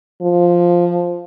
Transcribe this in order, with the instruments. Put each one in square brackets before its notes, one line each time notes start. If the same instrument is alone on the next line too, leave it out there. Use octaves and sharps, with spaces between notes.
[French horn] F3